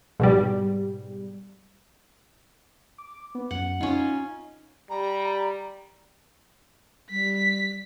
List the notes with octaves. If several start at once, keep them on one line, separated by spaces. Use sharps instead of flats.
G#2 B2 G3
D6
B3
F#2 F#5
C#4 D#4 F4
G3 A#5
G3 B6